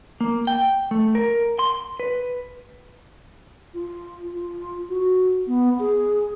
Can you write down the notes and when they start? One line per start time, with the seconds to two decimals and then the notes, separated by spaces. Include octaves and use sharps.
0.21 A#3
0.47 G5
0.91 A3
1.15 A#4
1.59 C6
2.00 B4
3.74 F4
4.34 F4
4.89 F#4
5.47 B3
5.79 G#4